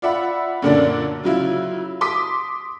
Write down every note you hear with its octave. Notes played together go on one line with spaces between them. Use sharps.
F4 D5 E5 F#5 B5
F#2 A#2 D3 A#3 D4
C#3 F#3 E4 F4
C6 D6 D#6 B6